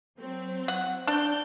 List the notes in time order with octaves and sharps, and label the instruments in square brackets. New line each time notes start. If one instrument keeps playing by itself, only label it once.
[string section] F#3 C4
[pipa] F#5
[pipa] D4 [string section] D5 G6